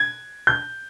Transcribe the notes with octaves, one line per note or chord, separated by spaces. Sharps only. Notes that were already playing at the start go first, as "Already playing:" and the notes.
Already playing: G#6
G6